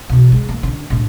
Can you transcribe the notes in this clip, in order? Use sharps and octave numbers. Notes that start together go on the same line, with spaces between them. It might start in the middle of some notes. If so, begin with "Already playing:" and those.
B2 E3
G#2 G#3
A#3
D3 C#4
A2 D4